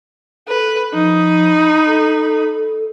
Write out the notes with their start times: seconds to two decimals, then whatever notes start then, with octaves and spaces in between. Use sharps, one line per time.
0.48 A4 B4
0.94 F3 D#4 B5
1.87 A4